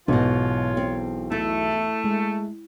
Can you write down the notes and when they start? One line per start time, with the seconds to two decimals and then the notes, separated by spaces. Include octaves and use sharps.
0.08 B1 E2 G#2 B2 F4 C#5
0.77 C4
1.32 A3 E4
2.04 G#3